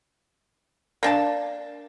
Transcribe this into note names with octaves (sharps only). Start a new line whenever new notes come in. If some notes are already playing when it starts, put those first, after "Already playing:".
A#3 D4 A5